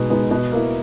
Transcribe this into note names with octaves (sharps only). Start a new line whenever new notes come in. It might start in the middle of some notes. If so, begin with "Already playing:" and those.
Already playing: B2 G#3 B3 D#4
G#3 B3 D#4
B2
A#3 E4